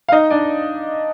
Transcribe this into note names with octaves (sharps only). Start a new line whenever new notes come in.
F5
D#4 D#5
D4 D5